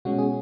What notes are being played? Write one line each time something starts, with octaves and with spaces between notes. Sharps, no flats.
B2 G#3 C#4 F#4
G#4